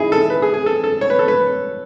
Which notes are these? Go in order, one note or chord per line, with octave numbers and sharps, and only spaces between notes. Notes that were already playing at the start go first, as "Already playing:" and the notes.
Already playing: D#4 E4 G#4
A4
B4
G#4
G#4
A4
A4
C#5
B4
A4
B4